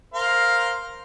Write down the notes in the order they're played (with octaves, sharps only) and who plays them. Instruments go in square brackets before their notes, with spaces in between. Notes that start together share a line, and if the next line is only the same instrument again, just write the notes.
[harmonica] A#4 C5 F5